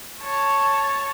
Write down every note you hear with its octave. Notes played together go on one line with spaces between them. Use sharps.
C#5 A5